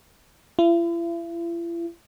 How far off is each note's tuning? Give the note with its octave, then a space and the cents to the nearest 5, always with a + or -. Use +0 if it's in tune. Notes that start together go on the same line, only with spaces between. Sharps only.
E4 +45